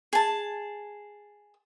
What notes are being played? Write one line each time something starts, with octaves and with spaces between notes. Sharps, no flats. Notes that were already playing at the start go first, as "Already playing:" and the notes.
G#4 A5